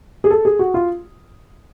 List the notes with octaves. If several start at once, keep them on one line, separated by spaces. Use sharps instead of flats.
G#4
A4
G#4
F#4
F4